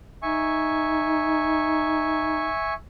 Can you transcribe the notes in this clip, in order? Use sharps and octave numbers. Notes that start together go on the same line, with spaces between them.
D#4 E5 G#5 C#6